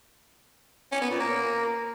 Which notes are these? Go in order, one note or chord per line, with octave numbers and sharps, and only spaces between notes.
C#4
B3
A#2
A#3